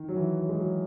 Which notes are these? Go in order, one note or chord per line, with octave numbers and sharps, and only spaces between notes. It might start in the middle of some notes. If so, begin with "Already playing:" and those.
Already playing: D#3
F#3
E3
F#3
G#3
F#3